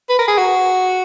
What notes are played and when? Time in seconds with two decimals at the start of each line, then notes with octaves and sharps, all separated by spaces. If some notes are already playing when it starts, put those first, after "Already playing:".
0.09 B4
0.19 A#4
0.28 G#4
0.38 F#4